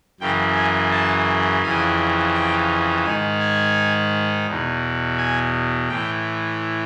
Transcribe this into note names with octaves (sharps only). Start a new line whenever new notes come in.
F#2 C#3 E3 G5
G#5
A5
F2 C#3 E3 G#5
G5
G#2 D#3 G#5
G#5
E2 B2
G#5
A2 E3 G5